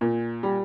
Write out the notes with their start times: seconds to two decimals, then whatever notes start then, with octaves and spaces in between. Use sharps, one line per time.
0.01 A#2
0.43 G3